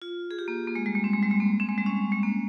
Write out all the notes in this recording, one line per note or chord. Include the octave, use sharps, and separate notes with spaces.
F4
G#4
G4
A#3
A#3
G#3
G3
G#3
C4
G#3
G3
G#3
A#3
C4
G#3
G3
C#4
G#3
A#3